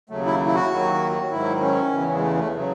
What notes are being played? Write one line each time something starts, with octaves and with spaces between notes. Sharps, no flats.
D#2 C#3 F#3 A3
E4
E4
F#4
D#2 D#3 F#3
G#2 D#3 F#3 E4
C#4
E2 C#3 E3
G#3
A3
A3
C#3 F#3